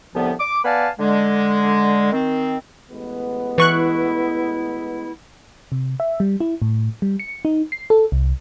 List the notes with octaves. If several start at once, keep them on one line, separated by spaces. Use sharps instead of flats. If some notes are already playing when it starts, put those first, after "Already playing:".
C2 A2 D3 F3 B3
D6
B3 B4 D5 F5 G#5 A5
D3 G#3
D#3 C4
A1 G#3 B3
E3 E4 C#6 F#6
C3
E5
G3
E4
A2
G3
C#7
D#4
C7
A4
C2